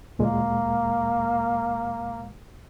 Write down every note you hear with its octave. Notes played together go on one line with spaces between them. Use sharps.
D2 A#2 G#3 A#3